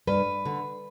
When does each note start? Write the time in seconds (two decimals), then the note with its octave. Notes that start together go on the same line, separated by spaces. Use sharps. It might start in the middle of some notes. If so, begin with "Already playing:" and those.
0.07 G2 B4
0.45 D3